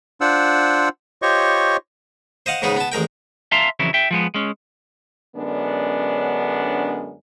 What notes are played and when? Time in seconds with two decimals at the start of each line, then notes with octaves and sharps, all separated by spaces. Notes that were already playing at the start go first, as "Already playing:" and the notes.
0.21 D4 F4 C5 F#5 E6
1.22 F4 G4 C5 C#5 D#5 C#6
2.46 C5 D#5 F5 F#5
2.62 G#2 C#3 G#3 B3 D#4
2.77 B3 A5
2.92 A1 G#3 A#4 G5
3.52 E5 F5 A5 A#5 C6
3.79 F2 C#3 E3 F#3 E4
3.94 E5 G5
4.11 F3 G#3 B3
4.35 G#3 C#4
5.36 F#2 D3 G#3 B3 C#4 D4